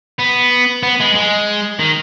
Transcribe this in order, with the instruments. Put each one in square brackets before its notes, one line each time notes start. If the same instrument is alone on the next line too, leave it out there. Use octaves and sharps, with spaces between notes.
[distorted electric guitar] B3
B3
G#3
G#3
D#3